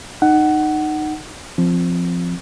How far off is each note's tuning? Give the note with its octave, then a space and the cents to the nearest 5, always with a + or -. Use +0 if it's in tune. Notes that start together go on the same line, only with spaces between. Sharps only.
D#4 -20 F#5 +15
F3 +0 C4 +0